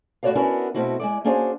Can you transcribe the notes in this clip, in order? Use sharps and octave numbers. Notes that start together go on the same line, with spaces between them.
A2 F#4 G4 C#5 D5 F5
B3 C#4 D4 E4 F#4 A#4
B2 A3 C4 E4 F#4
G#3 E4 D5
A#3 C#4 D4 F#4 G#4 C5